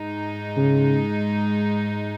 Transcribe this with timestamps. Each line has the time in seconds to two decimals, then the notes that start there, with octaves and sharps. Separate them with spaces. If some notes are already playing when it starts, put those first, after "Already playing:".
Already playing: G#2 G#3 D#4
0.57 C#3